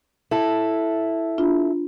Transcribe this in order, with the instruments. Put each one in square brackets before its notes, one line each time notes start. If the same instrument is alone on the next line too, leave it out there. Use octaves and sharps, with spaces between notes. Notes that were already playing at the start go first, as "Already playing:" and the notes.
[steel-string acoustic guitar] E4 A4
[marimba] D4 F4